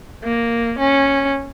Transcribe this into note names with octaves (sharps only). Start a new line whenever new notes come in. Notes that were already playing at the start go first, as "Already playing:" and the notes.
A#3
C#4